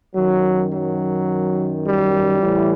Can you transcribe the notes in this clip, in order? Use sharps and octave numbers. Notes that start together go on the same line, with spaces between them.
F#2 D#3 F#3
F#3
G3
A2 E3